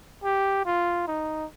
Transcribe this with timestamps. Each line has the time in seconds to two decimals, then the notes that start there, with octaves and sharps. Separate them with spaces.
0.24 G4
0.66 F4
1.08 D#4